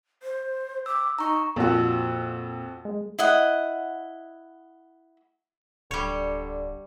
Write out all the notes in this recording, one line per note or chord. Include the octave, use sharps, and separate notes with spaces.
C5
D6 E6
D#4 A#5 C#6
F2 A#2 F3 F#4
G#3
E4 D#5 F#5
D1 D3 G3 C#5